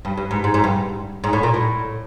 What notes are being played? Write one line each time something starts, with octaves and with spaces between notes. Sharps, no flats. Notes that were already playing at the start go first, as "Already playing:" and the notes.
G2
G2
G#2
G#2
G#2
G2
G#2
A2
A#2
A2